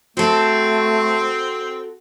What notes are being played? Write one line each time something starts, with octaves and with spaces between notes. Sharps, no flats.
A3 C4 F#4 A4